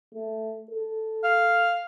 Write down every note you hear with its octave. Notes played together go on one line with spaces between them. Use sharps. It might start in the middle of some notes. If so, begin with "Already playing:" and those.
A3
A4
F5